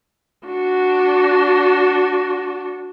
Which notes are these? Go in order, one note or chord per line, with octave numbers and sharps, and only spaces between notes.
D4 F#4